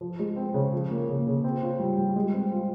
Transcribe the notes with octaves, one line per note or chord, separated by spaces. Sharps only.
F3
G#3
C4
C#3
F3
A#3
C#3
C#3
C4
F4
G3
G3
G#3
C4
F4